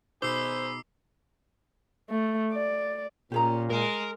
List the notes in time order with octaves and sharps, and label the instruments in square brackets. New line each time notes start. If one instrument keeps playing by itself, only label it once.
[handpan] B2 D#4 [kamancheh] G#4 B5 [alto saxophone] C5 [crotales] D6 E6 C7
[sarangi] A3
D5
[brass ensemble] A#2 [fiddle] C#4 [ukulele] G4 G#4 A#5
[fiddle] G#3 [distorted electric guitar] A#4